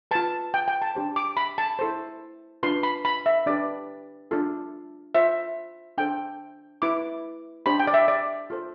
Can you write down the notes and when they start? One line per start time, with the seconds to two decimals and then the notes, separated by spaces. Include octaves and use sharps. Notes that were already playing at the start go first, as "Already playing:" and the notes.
0.11 F4 B4 A5
0.54 G5
0.68 G5
0.82 A5
0.95 D4 G4 C5
1.16 D6
1.37 B5
1.58 A5
1.79 E4 A4 C5
2.63 D4 F4 B4 C6
2.83 B5
3.05 B5
3.26 E5
3.46 D4 G4 B4 D5
4.31 D4 F4 A4
5.15 F4 C5 E5
5.98 D4 A4 C5 G5
6.82 E4 B4 D6
7.66 D4 G4 C5 B5
7.80 G5
7.87 D5
7.94 E5
8.08 D5
8.50 F4 A4 C5